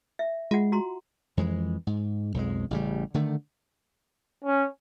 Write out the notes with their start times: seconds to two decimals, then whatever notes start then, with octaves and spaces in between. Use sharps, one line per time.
0.19 E5
0.51 G#3 F4 F#5
0.72 F#4 A#5 C6
1.37 F2 E3 G#3
1.87 G#2
2.34 B1 F2 F3 G#3
2.71 A1 C#3 G3
3.14 D3 D#3 A3
4.44 C#4